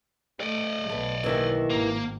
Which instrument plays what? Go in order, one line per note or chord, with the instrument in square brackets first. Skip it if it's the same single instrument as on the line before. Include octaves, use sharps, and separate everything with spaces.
[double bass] A3 [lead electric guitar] D5 D#5
[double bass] B1 [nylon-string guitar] A3 B3
[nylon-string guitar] D#2 D#3 E3
[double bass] G#1 [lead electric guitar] A#3